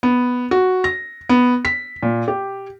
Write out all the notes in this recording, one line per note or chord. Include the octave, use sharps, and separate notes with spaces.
B3
F#4
A#6
B3
B6
A#2
G4